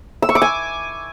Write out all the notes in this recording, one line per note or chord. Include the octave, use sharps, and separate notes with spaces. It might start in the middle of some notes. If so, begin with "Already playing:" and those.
E6
C#6
D6
G#5